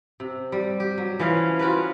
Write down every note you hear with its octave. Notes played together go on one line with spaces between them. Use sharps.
C3
G3
G4
F#3
E3 F3 C#4 F5
F4 F#4 A#4 B4